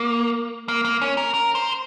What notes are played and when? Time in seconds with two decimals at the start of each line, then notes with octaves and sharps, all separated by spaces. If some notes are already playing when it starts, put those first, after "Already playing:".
Already playing: A#3
0.68 A#3
0.85 A#3
1.01 C#4
1.17 A#4
1.34 A#4
1.55 C5